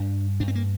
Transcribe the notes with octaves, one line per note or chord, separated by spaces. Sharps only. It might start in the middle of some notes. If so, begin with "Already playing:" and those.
Already playing: G2 D4
G2 D4
C4
A#3